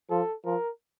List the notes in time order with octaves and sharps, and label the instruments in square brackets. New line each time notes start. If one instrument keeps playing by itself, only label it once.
[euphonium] F3 [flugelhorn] A4
[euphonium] F3 [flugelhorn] A#4